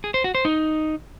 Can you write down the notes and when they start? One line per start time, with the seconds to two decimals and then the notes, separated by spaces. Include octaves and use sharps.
0.04 G#4
0.14 C5
0.24 F#4
0.35 C5
0.45 D#4